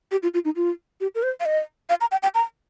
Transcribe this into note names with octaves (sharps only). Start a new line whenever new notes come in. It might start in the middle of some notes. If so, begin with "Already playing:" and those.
G4
F4
F4
D#4
F4
G4
A#4
C5
F5
D#5
F5
A#5
G5
G5
A#5